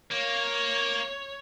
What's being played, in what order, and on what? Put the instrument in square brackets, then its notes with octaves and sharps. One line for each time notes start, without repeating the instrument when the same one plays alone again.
[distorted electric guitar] A#3 [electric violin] C#5